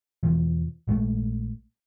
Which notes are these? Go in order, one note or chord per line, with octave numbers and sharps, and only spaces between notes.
E2 B2 E3 F3
A#1 G#3 A3